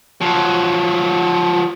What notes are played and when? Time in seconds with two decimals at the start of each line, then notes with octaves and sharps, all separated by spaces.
0.21 F3 F#3